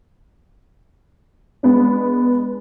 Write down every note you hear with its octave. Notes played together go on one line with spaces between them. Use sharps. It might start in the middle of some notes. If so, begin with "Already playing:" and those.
G#3 B3 D4